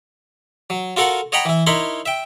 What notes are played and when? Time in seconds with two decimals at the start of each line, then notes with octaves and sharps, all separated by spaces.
0.70 F#3
0.97 F4 F#4 A4 A#4 F#5
1.32 C#5 D#5 F#5 G5 A#5 B5
1.45 E3 E4
1.67 D#4 E4 A#4 C#5 B5 C6
2.06 E5 G5